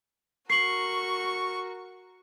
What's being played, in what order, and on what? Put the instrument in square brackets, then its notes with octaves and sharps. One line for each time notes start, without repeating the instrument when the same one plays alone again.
[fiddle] F#4 A#4 [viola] C#6 [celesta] C7 F#7